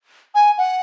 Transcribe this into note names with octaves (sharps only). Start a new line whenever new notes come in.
G#5
F#5